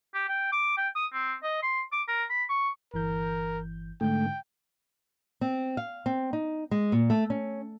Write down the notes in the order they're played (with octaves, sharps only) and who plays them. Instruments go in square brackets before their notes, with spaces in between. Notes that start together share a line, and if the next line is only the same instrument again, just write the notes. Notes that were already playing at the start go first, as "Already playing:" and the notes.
[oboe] G4
G5
D6
G5
D#6
C4
D#5
C6
D6
A#4
B5
C#6
[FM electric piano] G1 E3 G6 [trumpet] A#4
[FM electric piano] G#2 D3 G6 [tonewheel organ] A3 [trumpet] G5
[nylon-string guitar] C4
F5
C4
D#4
G#3
A#2
A3
C#4